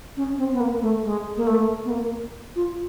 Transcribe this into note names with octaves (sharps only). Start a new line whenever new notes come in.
C#4
C4
B3
A#3
A3
G#3
A#3
A3
B3
A#3
F4